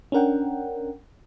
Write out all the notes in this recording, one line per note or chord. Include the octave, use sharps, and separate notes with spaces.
C#4 D4 A#4 F#5 G5